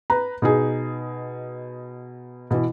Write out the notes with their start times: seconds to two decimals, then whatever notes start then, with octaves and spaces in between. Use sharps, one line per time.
0.10 B4 A#5
0.42 B2 D#4 G#4
2.51 B2 E3